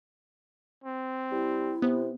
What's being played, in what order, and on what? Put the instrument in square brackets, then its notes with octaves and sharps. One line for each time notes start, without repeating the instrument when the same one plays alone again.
[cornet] C4
[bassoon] G3 [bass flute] E4
[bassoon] C3 [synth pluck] B3